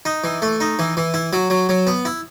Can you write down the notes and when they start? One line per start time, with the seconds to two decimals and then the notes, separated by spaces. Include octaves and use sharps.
0.05 D#4
0.24 E3
0.42 A3
0.60 D#4
0.79 E3
0.97 E3
1.14 E4
1.33 F#3
1.50 F#3
1.69 F#3
1.87 B3
2.05 E4